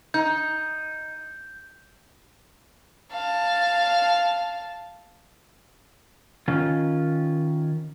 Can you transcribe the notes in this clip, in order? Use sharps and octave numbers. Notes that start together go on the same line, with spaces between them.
D#4 G6
F5 A5
D#3 C#4 F4